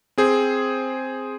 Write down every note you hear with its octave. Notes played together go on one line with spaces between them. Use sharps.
C4 G#4 C5